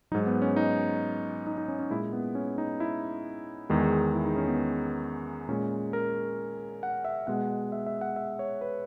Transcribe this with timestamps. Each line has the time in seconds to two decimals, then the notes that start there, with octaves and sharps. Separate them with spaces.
0.12 F#3 D#4
0.14 G#2
0.27 B3
0.42 C#4
0.56 D#4
1.47 D#4
1.58 D#4
1.68 C#4
1.79 C#4
1.90 A#2 G#3 E4
2.13 B3
2.35 C#4
2.58 D#4
2.80 E4
3.70 E2 D#3 G#3
4.14 E4
4.26 D#4
4.36 C#4
4.48 B3
5.49 A#2 G#3 C#4
5.93 A#4
6.83 F#5
7.05 E5
7.27 B2 G#3 F#5
7.72 E5
7.86 E5
8.01 F#5
8.16 E5
8.39 C#5
8.61 B4